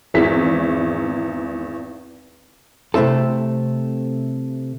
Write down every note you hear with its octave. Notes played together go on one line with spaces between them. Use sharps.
G#1 E2 E4 G#4 B6
C3 A3 C4 E4 A4